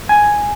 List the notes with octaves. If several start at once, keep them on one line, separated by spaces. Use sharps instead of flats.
G#5